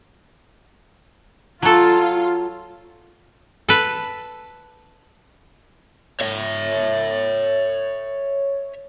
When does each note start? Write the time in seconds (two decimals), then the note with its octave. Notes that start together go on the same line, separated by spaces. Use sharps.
1.62 F#3 F4 A4
3.69 A4 B4
6.20 C#5 E5